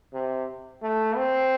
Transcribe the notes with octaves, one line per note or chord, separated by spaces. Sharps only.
C3
A3
C4